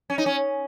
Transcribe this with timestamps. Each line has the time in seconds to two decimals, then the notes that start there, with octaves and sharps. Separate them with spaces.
0.10 C#4
0.18 D#4
0.26 C#4